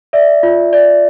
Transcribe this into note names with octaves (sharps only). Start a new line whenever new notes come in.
D5 E5
F4
D5